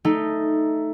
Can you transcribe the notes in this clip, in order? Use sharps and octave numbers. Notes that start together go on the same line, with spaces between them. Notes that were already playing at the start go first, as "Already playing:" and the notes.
A3 D#4